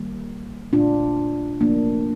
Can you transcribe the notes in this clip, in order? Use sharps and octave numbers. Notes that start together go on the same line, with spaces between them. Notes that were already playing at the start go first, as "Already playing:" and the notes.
Already playing: D#3 G3 A#3
A#2 A3 D4 F4
C3 F3 A3 A#3 D4